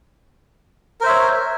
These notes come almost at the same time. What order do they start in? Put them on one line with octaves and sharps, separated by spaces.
A#4 C5 E5 C#5